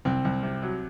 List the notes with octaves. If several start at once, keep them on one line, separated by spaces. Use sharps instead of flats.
C2 C4
C2
C3
F#3